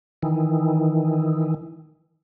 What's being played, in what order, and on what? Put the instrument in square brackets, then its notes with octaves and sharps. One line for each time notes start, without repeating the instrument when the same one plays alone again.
[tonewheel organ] D#3 E3